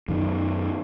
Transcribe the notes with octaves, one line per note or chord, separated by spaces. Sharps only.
F#2 D#3